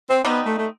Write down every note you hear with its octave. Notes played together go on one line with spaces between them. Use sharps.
C4
B2 G3 B3 C4 D#4
A3
A3